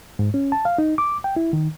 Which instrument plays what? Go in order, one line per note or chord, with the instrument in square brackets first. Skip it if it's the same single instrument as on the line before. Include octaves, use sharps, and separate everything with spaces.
[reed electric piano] G#2
C#4
A5
F5
D#4
D6
G5
E4
D#3